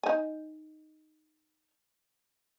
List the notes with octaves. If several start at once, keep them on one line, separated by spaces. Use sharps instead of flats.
D#4 G#5